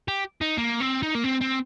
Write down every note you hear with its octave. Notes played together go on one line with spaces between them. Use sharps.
G4
D#4
A#3
C4
D#4
A#3
C4
C4